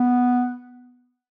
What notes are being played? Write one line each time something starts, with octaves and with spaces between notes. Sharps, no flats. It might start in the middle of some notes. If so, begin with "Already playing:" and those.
Already playing: B3